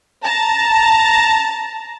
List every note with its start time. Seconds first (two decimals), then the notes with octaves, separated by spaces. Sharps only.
0.24 A5 A#5